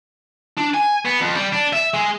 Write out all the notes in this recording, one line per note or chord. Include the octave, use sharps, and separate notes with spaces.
D4
G#5
B3
F2
G3
D4
E5
G#3